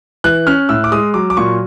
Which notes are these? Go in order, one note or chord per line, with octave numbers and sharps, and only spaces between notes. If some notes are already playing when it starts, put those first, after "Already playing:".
E3 F#6
C#4 F6
A2 E6
D6
G#3 D#6
F#3 D6
D6
A#2 C#6